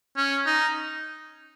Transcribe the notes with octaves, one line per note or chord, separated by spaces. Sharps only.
C#4
D#4